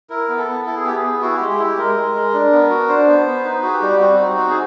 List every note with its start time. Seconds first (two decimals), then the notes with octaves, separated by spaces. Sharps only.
0.10 E4 A#4
0.28 B3
0.38 A4
0.47 B3
0.65 E4 A4
0.76 G#4
0.84 B3 G4
0.95 G#4
1.03 B3
1.21 E4 F#4
1.36 G#3 G4
1.49 G4
1.59 E4
1.64 G4
1.78 G#3 A#4
1.96 G#3
2.15 G#3
2.34 D4
2.52 B3
2.70 F#4
2.89 D4 C5
3.07 B3
3.26 B3
3.44 D#4 B4
3.62 F#4 G#4
3.72 G4
3.82 G3
4.00 C4 F#4
4.18 D#4
4.37 C4
4.49 G#4